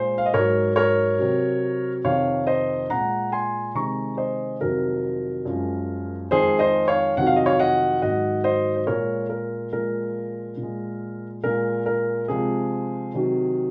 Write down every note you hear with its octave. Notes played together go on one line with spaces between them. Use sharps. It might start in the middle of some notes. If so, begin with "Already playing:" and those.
Already playing: A#2 G#3 C5
F5
D#5
G#2 F#3 A#4 C#5
A#4 C#5
C3 F#3
F2 C3 D#3 C#5 F5
C5 D#5
A#2 G#3 F#5 A#5
G#5 C6
C3 D#3 G#3 A#5 C#6
C5 D#5
F2 C3 D#3 F#3 A#4
F#2 F3 G#3
F2 D#3 G#3 G#4 C5
C5 D#5
C#5 F5
F2 C3 D#3 F#3 F#5
F5
D#5
C#5 F5
D#5 F#5
G#2 D#3 F#3 D#5 F#5
C5 D#5
C5
A#2 G#3 A#4 C#5
A#4
A#2 F3 G#3 A#4
A#2
G#3
A#2 G#3 A#4
A#4
C3 F3 G#3 G#4
C3 D#3 F#3